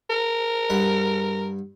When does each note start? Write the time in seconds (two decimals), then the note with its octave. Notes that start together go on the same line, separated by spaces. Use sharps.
0.10 A#4
0.70 G2 F#5 B5